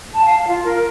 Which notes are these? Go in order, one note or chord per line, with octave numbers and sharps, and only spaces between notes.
A5
F5
F4
A#4